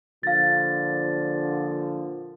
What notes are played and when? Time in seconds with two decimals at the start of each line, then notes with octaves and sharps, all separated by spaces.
0.23 A#2 D3 F3 F5 A6